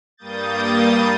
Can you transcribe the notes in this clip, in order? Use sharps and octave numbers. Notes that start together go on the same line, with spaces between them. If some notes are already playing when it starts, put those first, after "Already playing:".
G2 G3 A#3 D#6 G6 A6